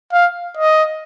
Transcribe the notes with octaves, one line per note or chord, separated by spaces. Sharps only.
F5
D#5